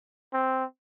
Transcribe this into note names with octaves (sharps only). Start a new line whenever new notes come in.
C4